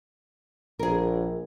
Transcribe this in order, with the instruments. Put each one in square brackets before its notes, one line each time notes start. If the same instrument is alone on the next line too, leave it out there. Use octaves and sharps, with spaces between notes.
[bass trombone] A#1 [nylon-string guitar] G#4 A#4